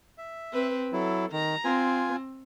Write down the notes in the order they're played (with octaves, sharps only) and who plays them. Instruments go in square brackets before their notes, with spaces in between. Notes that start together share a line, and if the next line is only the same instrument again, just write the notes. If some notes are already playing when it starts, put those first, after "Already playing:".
[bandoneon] E5
[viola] C4 B4
[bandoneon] F#3 E4 [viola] A4
[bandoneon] D#3 [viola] A#5
[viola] C4 [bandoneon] F4 G#5